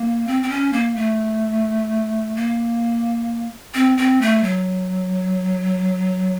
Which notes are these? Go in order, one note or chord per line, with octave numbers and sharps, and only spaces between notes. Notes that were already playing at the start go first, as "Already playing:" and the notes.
Already playing: A#3
C4
C4
C#4
A#3
A3
A#3
C4
C4
A3
F#3